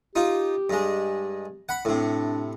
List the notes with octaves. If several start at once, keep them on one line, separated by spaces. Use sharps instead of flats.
D#4 F4 G4
G2 G#3
F#5 B5
A2 C3 D4